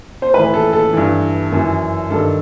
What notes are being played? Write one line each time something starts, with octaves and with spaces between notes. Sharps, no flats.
C5
A2 E3 B4
A4
A4
G2 E3
F#2 E3
G2 D#3 A4